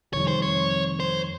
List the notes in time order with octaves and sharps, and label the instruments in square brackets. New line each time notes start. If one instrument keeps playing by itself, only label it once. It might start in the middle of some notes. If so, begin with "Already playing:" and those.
[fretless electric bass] F2 C3 D#3 G3 [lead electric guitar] C#5
[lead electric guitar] C5
C#5
C5